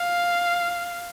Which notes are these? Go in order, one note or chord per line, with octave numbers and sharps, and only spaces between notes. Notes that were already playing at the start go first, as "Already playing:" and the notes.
Already playing: F5